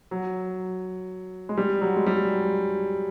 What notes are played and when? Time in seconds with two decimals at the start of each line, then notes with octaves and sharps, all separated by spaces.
0.11 F#3
1.49 G#3
1.57 G3
1.81 F#3
1.96 G#3
2.07 G3